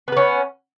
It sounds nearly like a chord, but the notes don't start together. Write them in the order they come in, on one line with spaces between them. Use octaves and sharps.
B3 B4 C#4